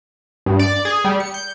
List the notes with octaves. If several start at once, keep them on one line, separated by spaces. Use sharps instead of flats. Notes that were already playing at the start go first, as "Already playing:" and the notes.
G2
D5
G#4
G3
C#7
G6